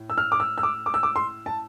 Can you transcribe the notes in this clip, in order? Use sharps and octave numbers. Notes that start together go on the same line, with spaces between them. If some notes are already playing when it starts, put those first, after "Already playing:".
Already playing: A2
E6
F6
D6
E6
E6
D6
D6
E6
D6
C6
A5